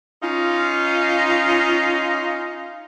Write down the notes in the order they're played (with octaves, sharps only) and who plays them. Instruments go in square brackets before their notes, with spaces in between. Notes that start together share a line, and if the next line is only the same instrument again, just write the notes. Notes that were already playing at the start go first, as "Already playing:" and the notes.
[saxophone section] C#4 D#4 F4